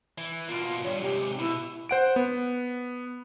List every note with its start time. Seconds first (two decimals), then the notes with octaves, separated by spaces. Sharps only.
0.18 E3
0.48 B2 A#3 F4
0.84 E2 G2 C#5
1.01 G#2 C3 G4
1.39 B2 E4
1.89 C5 F#5 D7
2.16 B3